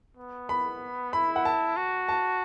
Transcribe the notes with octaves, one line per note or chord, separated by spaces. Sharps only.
B3
B5
E4 B5
F#5
A5
F#4
A5